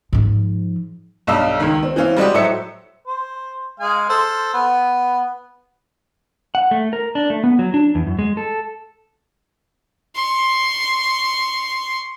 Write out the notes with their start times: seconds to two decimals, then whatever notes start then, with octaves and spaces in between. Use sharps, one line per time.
0.13 G#2 F3
1.27 B1 G2 D#5 F5 E6
1.60 C#2 D#3
1.83 C4
1.96 E3 C4 C#4 F5
2.16 G3 G#3 F#4 G4
2.34 A2 F#3 C5 E5 C#7
3.07 C5
3.80 G#3 F5 G#5
4.09 A4 C5 F6
4.54 B3
6.55 F#5
6.71 A3
6.93 A#4
7.15 D4
7.30 A3
7.44 B3
7.59 F#3
7.74 D4
7.95 E2
8.07 F#2
8.19 G#3
8.37 A4
10.15 C6 C#6